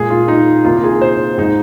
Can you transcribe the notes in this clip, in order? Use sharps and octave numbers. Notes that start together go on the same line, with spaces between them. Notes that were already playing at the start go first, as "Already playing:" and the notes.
Already playing: A#2 G#3 G#4
F4
D#4
C2 C3 D#3 A#3 F4
G#4
C5
G#2 G#3 D#4